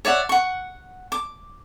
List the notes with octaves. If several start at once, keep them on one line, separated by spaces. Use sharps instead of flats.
C#5 D5 E5 F#5
F#5 C#6
D6